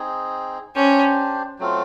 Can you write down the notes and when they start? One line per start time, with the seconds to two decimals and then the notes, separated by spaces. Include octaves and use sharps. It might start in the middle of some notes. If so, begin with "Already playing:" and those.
Already playing: C4 D#4 G#4
0.75 C#4 D4 G4 C5
1.59 F#3 A3 C4 F4